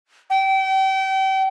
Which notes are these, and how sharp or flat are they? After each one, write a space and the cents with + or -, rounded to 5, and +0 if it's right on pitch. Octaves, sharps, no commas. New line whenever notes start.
G5 -35